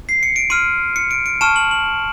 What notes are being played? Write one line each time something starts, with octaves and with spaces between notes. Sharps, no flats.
C7
C#7
D7
C6 F6 D#7
C#7
D7
D7
A5 C#6 F6 E7
F#7
F#7